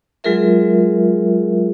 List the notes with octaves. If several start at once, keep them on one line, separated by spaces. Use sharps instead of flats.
F#3 G#3 F4 G#4 A#4 E5